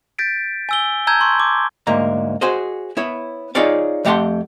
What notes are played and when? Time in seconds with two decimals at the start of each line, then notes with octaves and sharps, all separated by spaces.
0.19 G6 A6 B6 D7
0.69 G#5 E6 G7
1.07 A5 A#5 E6 G6 G#6
1.21 C6 C#6
1.40 D6
1.87 D2 G#2 A#3 A#5
2.41 F#4 G#4 C5 D#5
2.97 B3 E4 C#5
3.55 D#4 F4 G#4 C#5 D5 F5
4.05 F2 A3 G4 F#5 A5 C6